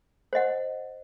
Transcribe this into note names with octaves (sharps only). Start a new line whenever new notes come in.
C5 D#5 F#5